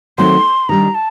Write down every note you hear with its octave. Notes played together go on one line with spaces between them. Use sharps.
D#3 F#3 A3 C4 C6
D#3 G3 D4 A#5
A5